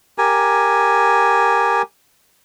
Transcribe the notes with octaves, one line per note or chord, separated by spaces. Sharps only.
G4 A#4 G#5